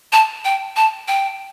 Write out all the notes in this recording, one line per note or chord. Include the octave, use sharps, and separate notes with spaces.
A5
G5
A5
G5